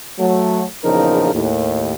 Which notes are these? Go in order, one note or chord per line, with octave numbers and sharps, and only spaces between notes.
F#3 A3
A#1 E2 C#3 F3 D#4 A#4
D#2 A2